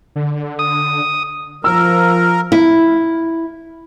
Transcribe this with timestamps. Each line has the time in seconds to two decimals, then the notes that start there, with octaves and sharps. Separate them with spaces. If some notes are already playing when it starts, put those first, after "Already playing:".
0.16 D3
0.59 D#6
1.64 F3 A#4 E6
2.52 E4